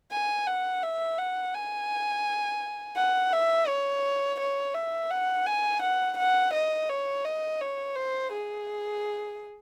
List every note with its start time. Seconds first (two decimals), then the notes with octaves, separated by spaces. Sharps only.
0.12 G#5
0.47 F#5
0.83 E5
1.18 F#5
1.54 G#5
2.97 F#5
3.33 E5
3.68 C#5
4.40 C#5
4.75 E5
5.11 F#5
5.47 G#5
5.82 F#5
6.18 F#5
6.54 D#5
6.89 C#5
7.25 D#5
7.61 C#5
7.96 C5
8.32 G#4